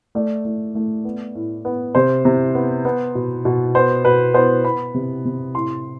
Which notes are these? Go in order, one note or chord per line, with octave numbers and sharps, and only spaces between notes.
A3 D5
A3
A3
B3
A2
B3
C3 C5
C3
B3
B3
B2
B2
B3 C5
B2 B4
B3 C5
B3 B5
C3
C3
A2 C6